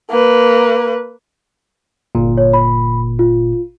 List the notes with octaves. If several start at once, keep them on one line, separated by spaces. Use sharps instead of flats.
A#3 B4
G1 A#2
C#5
B5
F4